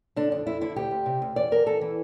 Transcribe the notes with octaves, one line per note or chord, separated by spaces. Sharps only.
D3 D4
F2 D4
F2 E4
D3 E4
D2 G4
D2
C3
D2
E2 D5
E2 A#4
E2 A4
E3